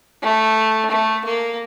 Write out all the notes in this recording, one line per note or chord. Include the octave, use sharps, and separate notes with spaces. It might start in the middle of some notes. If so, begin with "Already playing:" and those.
A3
A3
A#3